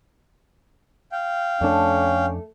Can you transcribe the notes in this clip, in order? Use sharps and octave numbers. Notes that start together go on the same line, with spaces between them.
F5 G5
F2 A3 C#4 D4 A4